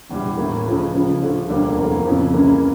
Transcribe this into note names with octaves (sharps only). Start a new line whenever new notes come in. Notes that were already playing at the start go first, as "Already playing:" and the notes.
E1 E2 E3 G3
A2 E3 A#3
C#2 C#3 F3 A3
C#2 C#3 F3
D2 D3 F3 A3
E1 D2 D3 G3 A#3
F1 E2 E3 A#3
F2 C#3 F3
C#2 C#3 E3 A#3 C#4